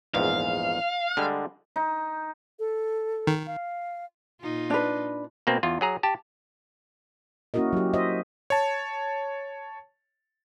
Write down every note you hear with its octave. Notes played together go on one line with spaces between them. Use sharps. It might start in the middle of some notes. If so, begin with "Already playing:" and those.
A#1 E2 G#2 F5
D3 G3 G#3
D#4
A4
D#3
F5
A#2 D#4 F4
D4 B4
B2 A#3 C4
E2 F4
F#3 G#4 A#5
G4 A5
A#3 C#4 E4 F#4 A#4 D#5
F#3 G4
C5 D#5 E5
C#5 A5